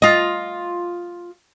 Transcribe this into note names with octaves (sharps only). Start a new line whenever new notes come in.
F4 D#5